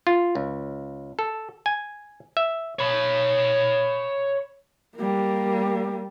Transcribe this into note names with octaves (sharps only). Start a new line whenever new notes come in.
F4
C#2
A4
G#5
E5
C#5 B5
G3 A#3